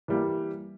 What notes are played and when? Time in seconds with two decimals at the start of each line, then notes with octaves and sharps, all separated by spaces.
0.08 E3 G3 A#3